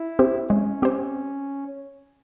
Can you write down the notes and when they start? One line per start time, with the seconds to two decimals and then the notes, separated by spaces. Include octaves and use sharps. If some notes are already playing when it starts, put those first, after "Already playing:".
Already playing: E4
0.19 C4 G4 C5
0.50 G#3 C#4
0.82 C4 G4 C5